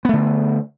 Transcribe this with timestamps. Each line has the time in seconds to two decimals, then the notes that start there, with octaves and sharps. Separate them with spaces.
0.05 B3
0.09 A3
0.13 D3